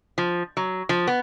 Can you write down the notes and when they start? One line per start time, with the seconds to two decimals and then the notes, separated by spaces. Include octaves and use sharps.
0.18 F3
0.57 F#3
0.89 F3
1.07 B3